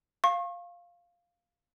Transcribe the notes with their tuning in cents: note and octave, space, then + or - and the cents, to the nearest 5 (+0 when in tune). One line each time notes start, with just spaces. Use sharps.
F5 +0 C#6 -35